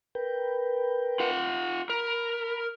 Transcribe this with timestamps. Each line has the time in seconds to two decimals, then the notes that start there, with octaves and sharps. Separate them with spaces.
0.15 A#4 B4 G5
1.20 F4 F#5
1.90 A#4 B5